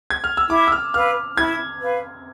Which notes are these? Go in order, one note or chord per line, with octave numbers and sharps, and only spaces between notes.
G#6
F6
E6
E4 D6
E6
F6
B4 F5 F6
E4 G#6
B4 F5